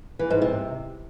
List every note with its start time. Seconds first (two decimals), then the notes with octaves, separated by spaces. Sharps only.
0.19 E3
0.30 G#2
0.42 C3